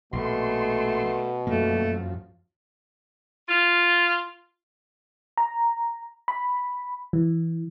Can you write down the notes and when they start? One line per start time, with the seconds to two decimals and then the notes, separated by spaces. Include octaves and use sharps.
0.13 A#1 B2 A3 C6
1.47 F#2 F3 A3 A#3
3.48 F4
5.38 A#5
6.28 B5
7.13 E3